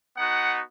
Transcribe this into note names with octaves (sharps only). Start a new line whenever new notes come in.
B3 D#4 F#4 F#5